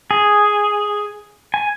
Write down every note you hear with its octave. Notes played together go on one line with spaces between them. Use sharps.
G#4
G#5